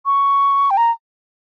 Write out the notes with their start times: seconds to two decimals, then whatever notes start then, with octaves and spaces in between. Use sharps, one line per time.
0.06 C#6
0.71 G5
0.77 A#5